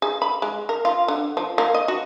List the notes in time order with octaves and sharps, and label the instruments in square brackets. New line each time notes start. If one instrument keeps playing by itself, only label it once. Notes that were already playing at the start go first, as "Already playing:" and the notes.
[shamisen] G#4
B5
G#3
A#4
F4
D3
F3
A#3
D#5
F#4